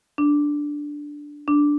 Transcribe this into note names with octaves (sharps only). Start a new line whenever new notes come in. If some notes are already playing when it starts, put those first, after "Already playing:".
D4
D4